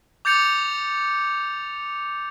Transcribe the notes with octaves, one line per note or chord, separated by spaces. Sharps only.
D6 G6 A6 C#7 F7